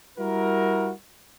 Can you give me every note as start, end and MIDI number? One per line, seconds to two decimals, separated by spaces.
0.18 0.91 55
0.18 0.91 64
0.18 0.91 66
0.18 0.91 70